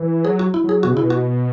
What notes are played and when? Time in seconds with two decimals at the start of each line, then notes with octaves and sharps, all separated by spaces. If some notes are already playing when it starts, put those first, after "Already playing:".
Already playing: E3
0.25 F#3 G#4
0.39 F#4
0.54 E4
0.64 F#3 G#4
0.83 B2 F#4
0.92 C#3
0.97 B2 E4
1.10 F#4